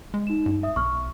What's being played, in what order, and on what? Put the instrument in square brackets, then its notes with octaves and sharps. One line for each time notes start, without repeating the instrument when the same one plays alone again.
[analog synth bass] G#3
[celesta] D#4 E7
[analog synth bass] G2
[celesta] E5 D#6
[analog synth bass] B1 [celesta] C#6 F6